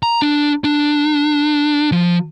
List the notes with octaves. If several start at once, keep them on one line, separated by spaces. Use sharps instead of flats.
A#5
D4
D4
F3